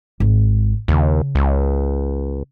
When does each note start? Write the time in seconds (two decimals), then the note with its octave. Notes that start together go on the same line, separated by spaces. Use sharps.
0.20 G#1
0.88 D#2 C#3
1.35 C#2